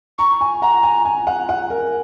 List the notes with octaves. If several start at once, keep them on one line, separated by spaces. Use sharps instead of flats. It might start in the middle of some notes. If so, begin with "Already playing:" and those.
A#5 C#6
G#5
F#5 A#5
G#5
G#5
F#5
F#5
A#4